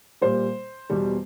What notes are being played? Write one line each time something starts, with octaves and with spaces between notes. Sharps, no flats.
A#2 G3 C5
E2 B2 G3